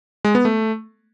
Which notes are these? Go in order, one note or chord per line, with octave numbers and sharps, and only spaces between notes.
G#3
B3
A3